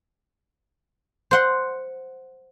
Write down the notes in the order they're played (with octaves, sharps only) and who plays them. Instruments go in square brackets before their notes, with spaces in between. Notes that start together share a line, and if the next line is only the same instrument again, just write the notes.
[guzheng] C5 F#5 C6